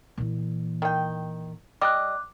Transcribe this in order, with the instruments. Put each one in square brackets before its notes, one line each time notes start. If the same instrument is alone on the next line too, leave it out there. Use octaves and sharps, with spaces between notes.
[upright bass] A#2 E3
[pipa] D#3 G5
[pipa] G3 D#5 [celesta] D6 F#6